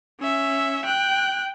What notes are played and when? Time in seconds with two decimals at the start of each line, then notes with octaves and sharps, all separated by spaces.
0.20 C#4 E5
0.85 G5 F#6